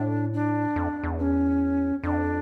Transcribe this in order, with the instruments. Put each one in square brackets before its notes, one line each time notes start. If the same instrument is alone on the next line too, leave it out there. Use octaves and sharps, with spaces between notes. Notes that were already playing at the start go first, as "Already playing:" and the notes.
Already playing: [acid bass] A2 [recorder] D4
[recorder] D4
[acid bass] F2
E2
[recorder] C#4
[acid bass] F2 [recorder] D4